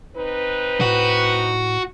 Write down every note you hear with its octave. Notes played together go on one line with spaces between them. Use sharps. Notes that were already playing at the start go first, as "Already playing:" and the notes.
C4 D#4 B4
A2 F#4